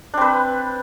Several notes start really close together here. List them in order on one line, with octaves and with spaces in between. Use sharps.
D4 C4 B4